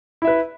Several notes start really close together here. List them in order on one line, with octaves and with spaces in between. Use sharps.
E4 E5 B4